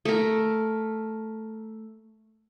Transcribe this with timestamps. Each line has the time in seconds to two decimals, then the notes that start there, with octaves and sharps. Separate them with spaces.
0.05 A3 A#4